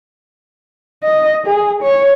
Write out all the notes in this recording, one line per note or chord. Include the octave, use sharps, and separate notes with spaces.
D#5
G#4
C#5